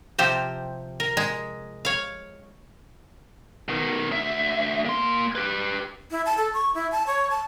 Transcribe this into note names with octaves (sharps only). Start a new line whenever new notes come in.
C3 F3 G4 C5
A#4
G#3
C#5 F5
B2 D#3
D2 E5
A#3 C6
G4 B4
E4
A5
A4
C#6
E4
A5
C#5
A5